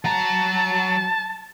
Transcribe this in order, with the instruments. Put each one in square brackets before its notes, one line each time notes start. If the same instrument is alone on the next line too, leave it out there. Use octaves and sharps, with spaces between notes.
[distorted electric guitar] F#3 A#5 [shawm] A5